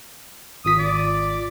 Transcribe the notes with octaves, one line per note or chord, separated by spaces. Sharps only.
G#1 F4 D#6 B6
D5